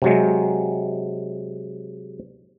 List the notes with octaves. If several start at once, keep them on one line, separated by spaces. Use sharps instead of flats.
C3 F#3 G#3